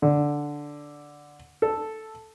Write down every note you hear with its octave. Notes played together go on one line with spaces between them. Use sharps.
D3
A4